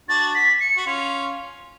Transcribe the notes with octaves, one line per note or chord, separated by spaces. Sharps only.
D4 F#4 A6
B6
C#7
F#4
C#4 F4